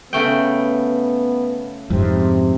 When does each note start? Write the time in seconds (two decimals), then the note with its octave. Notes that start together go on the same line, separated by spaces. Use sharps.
0.13 C#3 A3 B3 G5
1.90 F2 G#2 C3